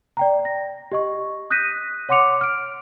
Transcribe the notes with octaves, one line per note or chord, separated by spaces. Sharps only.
D5 G5 A#5
A#6
G4 D#5 C#6
D#6 F#6 G6 A#6 B6 D#7
C#5 F#5 C6 D6 C#7 F7
F6 D7